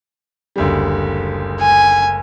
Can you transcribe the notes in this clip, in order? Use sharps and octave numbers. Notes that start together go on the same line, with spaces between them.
F#1 D2 G3
G#5